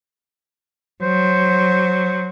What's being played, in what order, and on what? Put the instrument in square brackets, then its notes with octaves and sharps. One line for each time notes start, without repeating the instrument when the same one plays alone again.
[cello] F#3 [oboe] C5